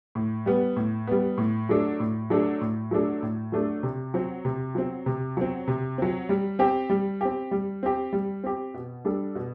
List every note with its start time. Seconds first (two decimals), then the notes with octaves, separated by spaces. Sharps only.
0.15 A2
0.46 G3 B3
0.76 A2
1.07 G3 B3
1.38 A2
1.69 F#3 A3 D4 A4
2.00 A2
2.30 F#3 A3 D4 A4
2.61 A2
2.91 F#3 A3 D4 A4
3.23 A2
3.52 F#3 A3 D4 A4
3.83 C3
4.14 F#3 C4
4.45 C3
4.75 F#3 C4
5.06 C3
5.37 F#3 C4
5.68 C3
5.98 F#3 C4
6.29 G3
6.59 C4 G4
6.90 G3
7.21 C4 G4
7.51 G3
7.83 C4 G4
8.13 G3
8.44 C4 G4
8.74 B2
9.05 G3 D4 A4
9.35 B2